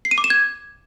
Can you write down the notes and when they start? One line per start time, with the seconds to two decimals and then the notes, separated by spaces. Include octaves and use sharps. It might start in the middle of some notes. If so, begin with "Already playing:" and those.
0.05 C7
0.11 D#7
0.18 D6
0.24 E7
0.30 G#6